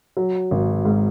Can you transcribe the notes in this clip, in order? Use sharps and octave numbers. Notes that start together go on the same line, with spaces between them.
F#3
G#1
G#2